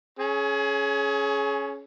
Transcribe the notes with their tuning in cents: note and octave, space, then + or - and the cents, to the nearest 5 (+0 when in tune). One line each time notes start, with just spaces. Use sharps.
C#4 +0 G#4 +30